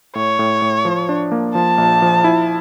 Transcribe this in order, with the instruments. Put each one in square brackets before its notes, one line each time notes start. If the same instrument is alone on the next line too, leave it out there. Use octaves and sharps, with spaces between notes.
[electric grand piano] A2 [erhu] C#5
[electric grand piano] A2
A2
F3
D4
A#3
[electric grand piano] F3 [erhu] A5
[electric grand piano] A#1
F3
E4